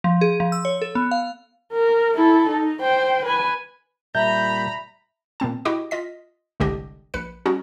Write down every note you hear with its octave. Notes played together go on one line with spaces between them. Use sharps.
F3
G#4
F3
E6
C#5
A4
B3
F5
A#4
E4 A4
D#4
C5 G5
B4 G#5
A#2 G3 E5 A#5 B5 G6
A#2 B3 C4 A5
E4 F#4 G4 D#5 G5 D6
F4 D#5 B6
G1 C2 D3 G#3 G4 D#5
A#1 B4 C#7
G3 C#4 D#4 F#4 G#4